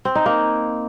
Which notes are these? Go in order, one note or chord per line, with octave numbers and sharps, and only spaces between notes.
C4
D#4
A#3